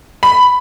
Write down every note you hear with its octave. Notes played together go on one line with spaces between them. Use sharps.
B5